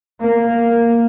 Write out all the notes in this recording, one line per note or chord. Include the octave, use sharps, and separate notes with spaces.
A#3